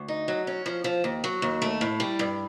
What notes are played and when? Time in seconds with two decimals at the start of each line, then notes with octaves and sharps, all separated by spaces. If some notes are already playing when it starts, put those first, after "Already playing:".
Already playing: D2
0.08 D#4
0.28 F#3
0.47 C#4
0.66 F3
0.84 F3
1.04 D#2
1.24 F#3
1.42 D#2
1.62 A3
1.81 A2
2.00 G3
2.19 G2